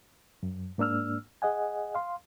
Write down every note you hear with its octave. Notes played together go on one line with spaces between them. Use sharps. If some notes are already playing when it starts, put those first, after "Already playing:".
F#2
G#2 A#3 D4 E6 F6
G#4 D#5 F#5 G#5
F5 C6